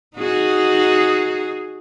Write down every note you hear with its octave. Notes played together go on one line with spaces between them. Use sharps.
D#4 F#4 G#4